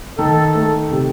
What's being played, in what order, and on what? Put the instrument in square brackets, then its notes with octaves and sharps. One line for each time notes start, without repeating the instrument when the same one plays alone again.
[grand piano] D#3 [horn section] A4
[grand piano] A3
C3